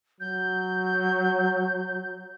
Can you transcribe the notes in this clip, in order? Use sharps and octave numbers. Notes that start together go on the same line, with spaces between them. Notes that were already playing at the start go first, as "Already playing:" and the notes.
F#3 G6